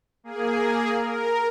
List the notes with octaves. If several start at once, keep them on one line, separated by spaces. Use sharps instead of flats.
A#3 G#4
A#4